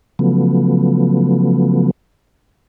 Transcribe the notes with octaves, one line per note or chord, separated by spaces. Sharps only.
C#3 F3 F#3 A3 B3